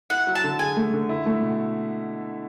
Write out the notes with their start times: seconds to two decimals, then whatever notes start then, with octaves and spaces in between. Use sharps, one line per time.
0.10 E4 F#5
0.27 F#3
0.35 A5
0.44 D3
0.59 G#4 G#5
0.77 A3
0.93 D3
1.09 E4
1.26 A3
1.42 B2